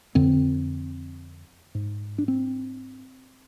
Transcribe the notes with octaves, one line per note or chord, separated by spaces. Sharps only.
F2 D3 C4
G#2
D4
C4